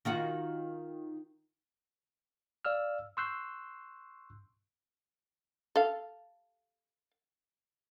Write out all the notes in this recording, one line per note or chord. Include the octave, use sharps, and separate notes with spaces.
D#3 F4 F#4
D5 F5 E6 F6
C6 C#6 E6 F#6 G6 C7
A4 F5